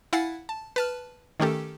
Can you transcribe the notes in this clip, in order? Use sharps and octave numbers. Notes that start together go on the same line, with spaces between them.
E4 F5 F#5 G#5 A6 C7
A5
B4 A5 F6
D#3 A3 C#4 G4 A4